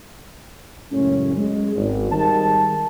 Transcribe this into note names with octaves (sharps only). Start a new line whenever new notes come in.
F#2 A2 C#3 G#3 C#4
G#3
G#1
D#3 G3 G#4 A5